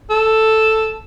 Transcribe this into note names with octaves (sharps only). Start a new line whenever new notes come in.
A4